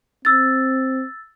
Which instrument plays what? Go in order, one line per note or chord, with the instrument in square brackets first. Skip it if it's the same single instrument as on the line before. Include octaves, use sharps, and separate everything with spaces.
[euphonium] C4 [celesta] E6 A6